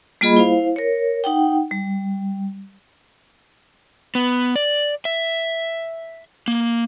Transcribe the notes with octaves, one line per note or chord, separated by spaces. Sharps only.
G3 A#3 F4 G#4 D#5 B5
E4 C5 F5
A#4 C#5
D#4 F#5 G5
G3
B3
D5
E5
A#3